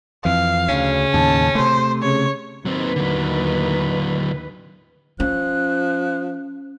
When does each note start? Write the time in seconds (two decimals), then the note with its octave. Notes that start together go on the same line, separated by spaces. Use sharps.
0.25 F2 E3 F5
0.69 D2 C#3 C#4
1.14 D#2 A2 A5
1.55 C3 A3 C5
2.03 C#3 C#5
2.65 D#2 F#3 C4 B4
2.96 D3 F#3
5.20 F3 C#4 F#6